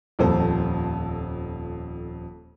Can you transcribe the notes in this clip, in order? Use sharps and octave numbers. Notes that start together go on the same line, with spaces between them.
D#1 F2 A4 C5